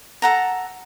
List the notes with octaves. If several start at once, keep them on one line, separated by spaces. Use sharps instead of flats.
A4 F#5 A#5